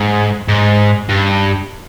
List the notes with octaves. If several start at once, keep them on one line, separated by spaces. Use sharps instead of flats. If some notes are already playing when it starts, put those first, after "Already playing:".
Already playing: G#2
G#2
G2